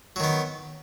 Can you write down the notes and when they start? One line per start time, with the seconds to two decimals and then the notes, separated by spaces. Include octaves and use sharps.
0.16 F#3
0.20 D#3
0.24 B3